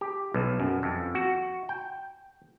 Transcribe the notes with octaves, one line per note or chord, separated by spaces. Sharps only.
G4
B1
F#2
F2
F#4
G5